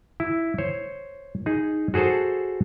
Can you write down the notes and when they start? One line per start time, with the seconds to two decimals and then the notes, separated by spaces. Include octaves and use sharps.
0.20 E4
0.58 C5 C#5
1.46 D#4 G#4
1.94 F#4 G#4 A4 C5 A5